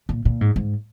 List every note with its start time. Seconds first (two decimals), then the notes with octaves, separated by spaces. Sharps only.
0.09 A#2
0.25 A#2
0.41 G#2
0.56 G#2